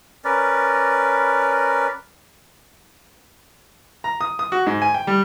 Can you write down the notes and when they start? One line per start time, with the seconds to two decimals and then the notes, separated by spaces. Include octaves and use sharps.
0.25 C#4 A#4 B4 D5
4.04 A#5
4.21 D#6
4.39 D#6
4.52 F#4
4.67 G#2
4.82 G#5
4.94 G5
5.07 G3